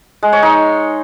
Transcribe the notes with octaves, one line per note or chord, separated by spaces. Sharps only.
G#3
C#5
D#4